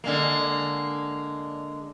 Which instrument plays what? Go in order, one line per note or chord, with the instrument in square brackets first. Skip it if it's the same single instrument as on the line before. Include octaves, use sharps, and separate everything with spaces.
[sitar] D3 G#3 A#3